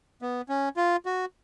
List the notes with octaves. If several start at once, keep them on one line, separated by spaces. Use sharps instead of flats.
B3
C#4
F4
F#4